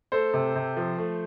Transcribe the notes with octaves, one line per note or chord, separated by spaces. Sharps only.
A3 A4 C5
C3
C3
F3
A3